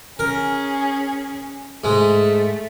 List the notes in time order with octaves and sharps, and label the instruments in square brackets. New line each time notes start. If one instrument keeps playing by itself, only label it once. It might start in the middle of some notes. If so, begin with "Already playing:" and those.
[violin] C#4 G#4 [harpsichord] A#4
[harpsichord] G#2 G#3 [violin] A3